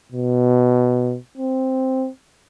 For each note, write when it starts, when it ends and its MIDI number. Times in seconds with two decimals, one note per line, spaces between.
0.12 1.17 47
1.37 2.09 60